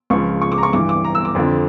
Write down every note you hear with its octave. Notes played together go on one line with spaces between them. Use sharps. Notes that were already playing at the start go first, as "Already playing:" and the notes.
C#2 C#3 F3 C#6
C#6
D6
A#5
C#6
G2 E3 D6
D6
A#5
E6
D6
F2 D3 F3